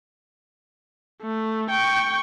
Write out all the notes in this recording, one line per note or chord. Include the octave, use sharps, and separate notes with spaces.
A3
G5 C#6